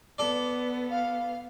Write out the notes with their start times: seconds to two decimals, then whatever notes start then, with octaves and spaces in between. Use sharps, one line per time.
0.18 B3 A4 D5
0.90 F5